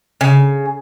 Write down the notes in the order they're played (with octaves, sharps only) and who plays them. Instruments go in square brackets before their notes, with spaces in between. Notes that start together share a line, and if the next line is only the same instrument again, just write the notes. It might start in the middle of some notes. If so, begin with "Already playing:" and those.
[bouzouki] C#3